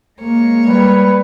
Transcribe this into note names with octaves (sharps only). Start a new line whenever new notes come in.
G#3 A#3 C#5
G3 B4